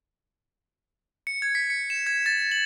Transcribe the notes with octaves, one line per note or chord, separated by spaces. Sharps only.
C#7
G#6
B6
C#7
E7
G#6
A6
F#7